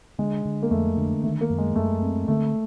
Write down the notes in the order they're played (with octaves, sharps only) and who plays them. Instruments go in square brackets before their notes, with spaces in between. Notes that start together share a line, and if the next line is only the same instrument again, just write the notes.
[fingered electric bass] D3 [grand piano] G#3
[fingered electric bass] D3
[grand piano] A#3
[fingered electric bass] F2 [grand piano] A3
[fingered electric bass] D3
[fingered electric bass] D#3 [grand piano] A3
[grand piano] A#3
[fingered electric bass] F#2
[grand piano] G#3
[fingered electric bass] F#2 [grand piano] A3
[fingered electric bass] C4
[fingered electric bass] D3 [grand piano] A3